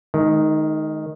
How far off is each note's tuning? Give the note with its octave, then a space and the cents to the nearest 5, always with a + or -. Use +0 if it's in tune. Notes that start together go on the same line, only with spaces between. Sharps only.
D#3 +0 G#3 +40